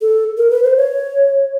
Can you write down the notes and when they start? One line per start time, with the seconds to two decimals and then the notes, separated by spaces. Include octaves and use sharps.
0.01 A4
0.38 A#4
0.51 B4
0.64 C5
0.77 C#5